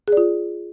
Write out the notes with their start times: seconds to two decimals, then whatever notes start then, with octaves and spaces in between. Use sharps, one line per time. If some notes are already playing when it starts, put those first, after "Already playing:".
0.08 G#4
0.12 D5
0.17 F4